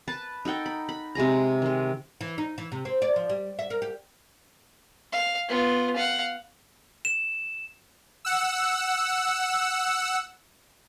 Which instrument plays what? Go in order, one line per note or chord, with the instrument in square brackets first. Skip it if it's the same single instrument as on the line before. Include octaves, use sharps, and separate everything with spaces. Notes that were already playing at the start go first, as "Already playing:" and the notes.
[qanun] B4 A5
D#4 A4 F#5 G5
B5
B5
C3 G#3 G#4 A#5
D#3 G#3
[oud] E3
D#4
E3
C3
C4
D5
F3
G3
E5
A#4
G4
[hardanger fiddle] F5
B3 F4
F5 F#5
[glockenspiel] E7
[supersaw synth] F#5 E6